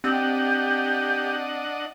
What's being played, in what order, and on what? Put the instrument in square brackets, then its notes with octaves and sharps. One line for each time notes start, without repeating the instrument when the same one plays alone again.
[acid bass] C4 [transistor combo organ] D4 D#5 F#5 [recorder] G4